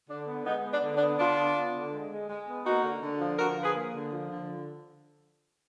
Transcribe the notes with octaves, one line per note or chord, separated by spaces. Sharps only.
D3 D4
B3
G#3 B3 D#4
B3
D4
D3
D4
B3
D3 D4 F4
B3
B3
D3
G#3
G#3
G#3
B3
A#3 D#4 F#4
D3
D3
F3
D3 F#4 A#4
F3
G#4 B4
A#3
D3
F3
D3